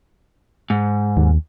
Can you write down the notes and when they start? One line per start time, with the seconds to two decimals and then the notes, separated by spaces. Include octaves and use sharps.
0.70 G#2
1.17 D#2